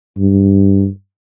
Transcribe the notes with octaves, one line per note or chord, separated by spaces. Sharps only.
G2